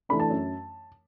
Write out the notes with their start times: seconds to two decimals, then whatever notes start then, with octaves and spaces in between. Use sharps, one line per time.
0.09 E3 A3 D4 B5
0.20 A5
0.30 F#2